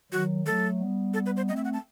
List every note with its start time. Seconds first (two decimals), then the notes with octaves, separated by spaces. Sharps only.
0.12 D#3 F#3 F#4
0.46 F#3 A3 A4
0.80 G3 B3
1.14 A4
1.26 B4
1.37 C5
1.48 A3 C4 D#5
1.56 E5
1.64 F#5
1.73 A5